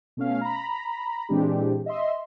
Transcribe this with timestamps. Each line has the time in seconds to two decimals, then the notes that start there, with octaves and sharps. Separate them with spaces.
0.17 B2 A3 C#4 F5
0.41 A#5 B5
1.29 A#2 E3 G#3 C4 D4 G4
1.86 D#5 E5 C6